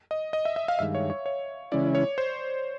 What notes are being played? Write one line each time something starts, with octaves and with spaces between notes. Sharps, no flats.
D#5
D#5
E5
E5
F5
G2 D#3 G#3 E5
C#5
C#5
C#5
C#3 E3 G#3 C#4 E4 D5
C#5
C5